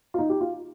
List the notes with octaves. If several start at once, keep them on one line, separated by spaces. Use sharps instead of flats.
F4
D#4
G4
F4